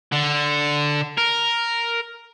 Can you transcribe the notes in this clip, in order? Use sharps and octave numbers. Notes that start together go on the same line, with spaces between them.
D3
A#4